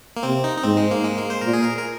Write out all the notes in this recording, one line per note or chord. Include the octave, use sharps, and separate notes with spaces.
A#3
C3 C4
D#4
D#4
G#2 C4
G#3
A#3
G#3
A#3
C5
A#2 A#4
G#4
A#4
A#4